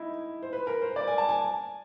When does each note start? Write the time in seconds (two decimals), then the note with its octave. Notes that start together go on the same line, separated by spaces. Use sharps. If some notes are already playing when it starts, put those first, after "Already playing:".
Already playing: D#4 E4
0.43 C5
0.53 B4
0.67 A#4
0.82 C5
0.96 D5
1.07 G#5
1.18 A5
1.29 G#5